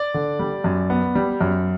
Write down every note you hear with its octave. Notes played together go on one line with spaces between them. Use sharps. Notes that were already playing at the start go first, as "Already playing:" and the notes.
Already playing: D5
D3
G3
F#2
B3
G3
F#2